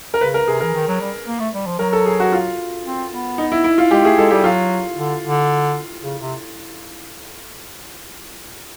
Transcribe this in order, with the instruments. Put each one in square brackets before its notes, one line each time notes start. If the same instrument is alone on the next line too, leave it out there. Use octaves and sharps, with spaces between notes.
[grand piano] A#4
[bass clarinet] C#3 [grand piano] B4
[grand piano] A#4
[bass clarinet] C3 [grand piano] G#4
[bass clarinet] E3 [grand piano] A#4
[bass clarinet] D#3
F#3
G3
A#3
A3
G3
F3
[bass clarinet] F#3 [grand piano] A#4
[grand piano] A4
G#4
F#4
F4
[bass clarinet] C4
B3
[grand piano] D#4
E4
E4
F4
[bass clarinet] G#3 [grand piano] G4
[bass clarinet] A3 [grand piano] G#4
[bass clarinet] G#3 [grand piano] A4
[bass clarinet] G3 [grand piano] G4
[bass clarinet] F#3 [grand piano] F4
[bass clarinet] D3
D3
C#3
C3